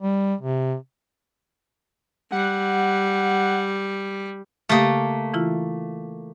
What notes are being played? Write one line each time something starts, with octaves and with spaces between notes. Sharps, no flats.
G3
C3
G3 F#5
C#3 A3 A#3 G4 D#6
E3 E4 F4